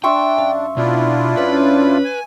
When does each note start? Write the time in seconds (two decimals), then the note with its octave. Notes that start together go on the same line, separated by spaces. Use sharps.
0.04 D4 E5 G5 C6 C#6
0.37 F#2 F5
0.77 B2 D4 E4 F4
1.37 F#2 C#4 B4
2.05 G#5